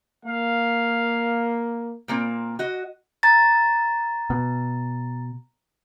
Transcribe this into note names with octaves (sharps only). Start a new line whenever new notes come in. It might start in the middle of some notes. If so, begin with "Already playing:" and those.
A#3 F5
A#2 A#3 C4
F#4 D#5
A#5 A6
B2